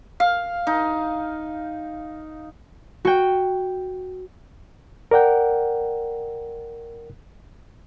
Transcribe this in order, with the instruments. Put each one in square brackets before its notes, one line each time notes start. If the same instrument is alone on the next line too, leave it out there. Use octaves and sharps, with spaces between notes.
[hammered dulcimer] F5
D#4
[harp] F#4 G5
[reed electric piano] A#4 D5 F#5 G5